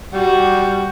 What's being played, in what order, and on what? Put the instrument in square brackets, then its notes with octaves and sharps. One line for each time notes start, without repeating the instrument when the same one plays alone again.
[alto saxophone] G3 [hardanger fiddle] F#4